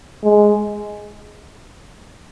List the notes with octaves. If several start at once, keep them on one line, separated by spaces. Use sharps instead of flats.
G#3